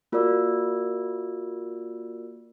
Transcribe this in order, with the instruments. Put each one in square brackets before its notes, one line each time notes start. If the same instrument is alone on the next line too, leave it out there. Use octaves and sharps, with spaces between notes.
[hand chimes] A#3 F4 F#4 A#4 D5 E6